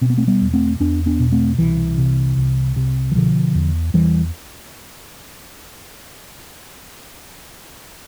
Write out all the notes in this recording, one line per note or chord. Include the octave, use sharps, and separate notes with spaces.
B2 C4
B3
A3 C4
G3 B3
E2
A3 C4
E2 B3 D4
B3 D4
B2
A3 C4
C2 E3
C3
C2
C3
E3
B2 D3 F3
E2
E2 E3 G3